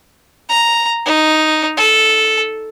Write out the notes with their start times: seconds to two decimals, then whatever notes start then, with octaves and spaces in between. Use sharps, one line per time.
0.49 A#5
1.06 D#4
1.77 A4